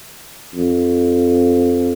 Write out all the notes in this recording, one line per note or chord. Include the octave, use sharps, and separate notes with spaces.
F2